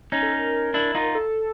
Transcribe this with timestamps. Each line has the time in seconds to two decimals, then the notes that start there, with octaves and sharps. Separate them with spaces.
0.12 C#4 D#4
0.23 A4
0.33 A#4
0.74 D4 E4
0.95 D#4 F4
1.15 A4